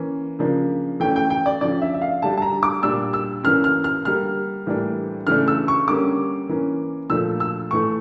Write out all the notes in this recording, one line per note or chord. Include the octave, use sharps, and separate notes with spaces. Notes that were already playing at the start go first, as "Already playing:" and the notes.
Already playing: E3 A#3 C#4
C#3 F3 A#3 D4
E3 A3 C#4 G5
G5
G5
D5
D3 F3 C#4 D5
E5
E5
F5
D3 G3 D4 A5
A5
A#5
D6
A#2 G3 D4 E6
E6
E3 A#3 C#4 F6
F6
F6
D3 G3 A#3 F6
A2 E3 G3 A#3 D4
C#3 E3 A3 D4 F6
E6
C#6
D3 G3 A#3 C#4 D6
E3 A#3 C#4
A#2 F3 A3 D4 E6
E6
A2 E3 A3 C#6